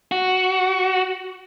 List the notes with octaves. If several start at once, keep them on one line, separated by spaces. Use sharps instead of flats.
F#4